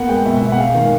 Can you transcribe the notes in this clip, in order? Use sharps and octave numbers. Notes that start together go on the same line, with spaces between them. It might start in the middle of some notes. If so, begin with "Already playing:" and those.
Already playing: A#3 B3 F#5
G#3 G5
B2 E5
B2 E5
F#5
G#3 F5
D#3